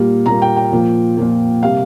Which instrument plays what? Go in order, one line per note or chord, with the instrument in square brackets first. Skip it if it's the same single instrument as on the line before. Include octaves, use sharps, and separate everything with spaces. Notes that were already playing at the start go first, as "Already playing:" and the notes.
Already playing: [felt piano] A#2 G3 A#3
A#2 G3 A#3 A#5
G5
G5
A#2 F3 A#3
A#2 F3 A#3
C3 G3 A#3 F5